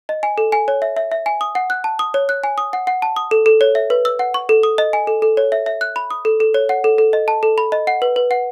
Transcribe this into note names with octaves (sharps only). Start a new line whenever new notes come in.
D#5
G#5
A4
G#5
C#5
E5
E5
E5
G#5
D#6
F#5
F#6
A5
D#6
C#5
F#6
G#5
D#6
F#5
F#5
A5
D#6
A4
A4
C#5
E5
B4
E6
F#5
C#6
A4
D#6
D#5
G#5
A4
A4
C#5
E5
E5
F#6
B5
D#6
A4
A4
C#5
F#5
A4
A4
D#5
A5
A4
B5
D#5
F#5
B4
B4
F#5